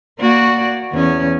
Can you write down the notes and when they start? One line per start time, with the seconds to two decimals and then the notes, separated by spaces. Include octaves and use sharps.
0.19 A#3 F#4 D5
0.93 E2 C#4